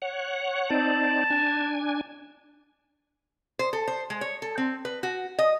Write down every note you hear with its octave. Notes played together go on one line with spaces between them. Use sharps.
C#5 F#5
C4 D#4 D5 A5
D4 G#5
C5
A4
C5
G#3
C#5
A4
C4
B4
F#4
D#5